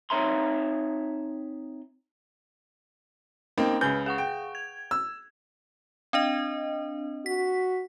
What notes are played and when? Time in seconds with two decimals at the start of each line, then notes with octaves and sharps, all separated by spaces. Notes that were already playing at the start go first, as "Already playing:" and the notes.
0.10 C4 D#4 C#5 E5 A#5 C6
3.58 A#3 C4 C#4 D#4
3.81 C#2 C#3 B4 G#5 G6
4.06 G#4 F#5 C#6
4.18 G5
4.55 G#6
4.91 E6
6.13 C4 D4 D#5
7.26 F#4 B6